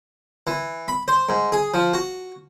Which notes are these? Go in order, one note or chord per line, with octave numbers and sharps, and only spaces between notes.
E3
B5
C5
G#2
G#4
F3
F#4